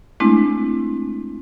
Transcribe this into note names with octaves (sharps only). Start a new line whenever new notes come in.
G#3 A3 C4 D4 E4